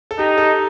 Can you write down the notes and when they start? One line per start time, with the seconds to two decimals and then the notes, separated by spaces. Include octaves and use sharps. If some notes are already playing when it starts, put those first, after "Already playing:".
0.11 A4
0.19 D#4 G4
0.37 A4